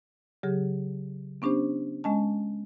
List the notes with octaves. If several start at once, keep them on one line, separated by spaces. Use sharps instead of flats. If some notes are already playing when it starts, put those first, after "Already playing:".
C#3 F#3 G4 G#4
B3 C#4 D4 G4 C5
G#3 C#4 D#5 A5